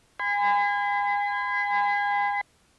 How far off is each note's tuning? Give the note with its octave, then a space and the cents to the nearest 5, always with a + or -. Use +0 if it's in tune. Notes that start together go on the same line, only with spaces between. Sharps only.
G#5 -30 B5 +45